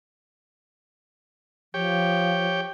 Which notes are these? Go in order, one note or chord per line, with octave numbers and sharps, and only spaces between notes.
F3 G4 C#5 G5